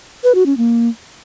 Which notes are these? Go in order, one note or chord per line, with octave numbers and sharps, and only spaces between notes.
B4
F#4
C#4
A#3